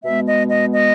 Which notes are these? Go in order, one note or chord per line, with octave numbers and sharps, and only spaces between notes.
B2 G#3 B3 E5
D#5
D#5
D#5